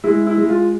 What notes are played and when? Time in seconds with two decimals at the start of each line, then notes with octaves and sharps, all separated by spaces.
0.04 G#3 E4
0.27 E4
0.38 G#3
0.49 F4